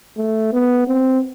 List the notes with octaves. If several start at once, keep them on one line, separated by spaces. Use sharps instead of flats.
A3
B3
C4